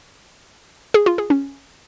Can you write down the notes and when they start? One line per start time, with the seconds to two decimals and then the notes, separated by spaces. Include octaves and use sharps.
0.94 G#4
1.06 F4
1.18 G#4
1.30 C#4